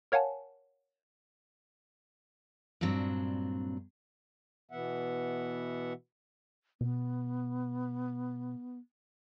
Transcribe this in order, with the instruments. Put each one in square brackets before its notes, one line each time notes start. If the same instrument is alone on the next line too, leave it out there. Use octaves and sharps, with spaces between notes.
[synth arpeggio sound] A#4 C#5 F5 F#5 G#5 A5
[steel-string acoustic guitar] G2 A#2 F#3 C4 D4
[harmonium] B2 E3 B3 E5 F#5
[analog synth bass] B2 [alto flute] B3